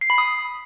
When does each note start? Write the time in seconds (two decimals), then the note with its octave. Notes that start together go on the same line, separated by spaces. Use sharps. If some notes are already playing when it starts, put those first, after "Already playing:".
0.01 C7
0.10 B5
0.18 D#6